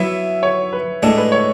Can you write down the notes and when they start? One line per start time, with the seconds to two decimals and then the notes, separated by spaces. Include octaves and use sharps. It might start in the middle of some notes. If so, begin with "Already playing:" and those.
Already playing: F#3 B3 E4 E5
0.43 C#5
0.73 B4
1.03 A2 G#3 D4 A4
1.18 B4
1.32 C#5